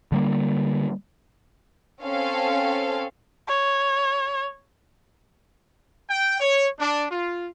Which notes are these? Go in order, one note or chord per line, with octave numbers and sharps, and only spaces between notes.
D3 G3 A#3
C4 C#4 A4 F5
C#5
G5
C#5
D4
F4